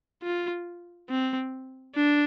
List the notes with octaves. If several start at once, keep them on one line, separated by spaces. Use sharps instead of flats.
F4
C4
D4